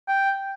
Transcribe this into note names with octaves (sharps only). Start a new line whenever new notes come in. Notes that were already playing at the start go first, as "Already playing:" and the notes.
G5